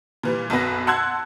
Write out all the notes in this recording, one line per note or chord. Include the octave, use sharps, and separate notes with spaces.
A#2 E3 G3
B1 F#2 B2 B4 A#6
F#5 A5 C6 E6 F#6 G#6